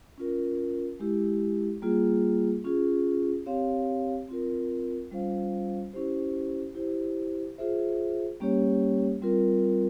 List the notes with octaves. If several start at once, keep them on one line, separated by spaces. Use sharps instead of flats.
C#4 F4 A#4
G#3 E4 G4
G3 A#3 F4 G#4
C#4 F4 G#4
C4 G4 C#5 F5
C4 F4 A#4
G3 C#4 F4 C5 F5
C#4 E4 G4 C5
E4 G4 C5
F4 G#4 C5 E5
G3 A#3 C#4 G4 C#5
G3 C4 F4 A#4